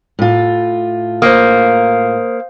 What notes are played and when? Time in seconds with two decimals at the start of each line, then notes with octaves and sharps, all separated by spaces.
0.19 A2 F4
1.22 A#3 C5 F5 D#6